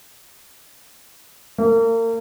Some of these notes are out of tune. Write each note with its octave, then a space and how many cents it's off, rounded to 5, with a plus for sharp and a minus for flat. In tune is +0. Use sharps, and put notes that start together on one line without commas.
A#3 -35